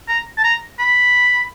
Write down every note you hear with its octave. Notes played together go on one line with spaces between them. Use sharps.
A#5
A5
A#5
B5